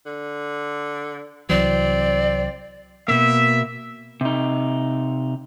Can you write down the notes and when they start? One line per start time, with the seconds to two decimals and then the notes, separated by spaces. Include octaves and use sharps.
0.06 D3
1.49 C2 E3 F#3 C4 D5
3.08 B2 A#3 E5
4.21 C3 D#4